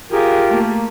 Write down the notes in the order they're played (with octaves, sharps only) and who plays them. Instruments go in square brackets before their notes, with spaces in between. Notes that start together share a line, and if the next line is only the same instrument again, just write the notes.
[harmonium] F4 G4 A#4 [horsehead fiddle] G#4
[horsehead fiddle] A3 A#3